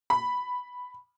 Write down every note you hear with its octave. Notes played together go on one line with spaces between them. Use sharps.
B5